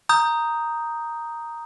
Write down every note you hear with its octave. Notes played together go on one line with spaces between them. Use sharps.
A#5 D#6 G6